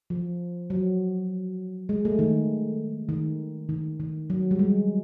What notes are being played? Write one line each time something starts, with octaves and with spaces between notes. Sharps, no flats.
F3
F#3
G#3
A3
D#3
D#3
D#3
D#3
F#3
G3
G#3